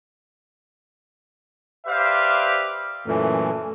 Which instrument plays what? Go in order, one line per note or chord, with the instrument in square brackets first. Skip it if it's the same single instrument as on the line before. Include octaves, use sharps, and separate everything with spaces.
[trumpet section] G4 B4 C5 D5 E5 F5
[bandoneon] F#2 A#2 E3 [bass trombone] A3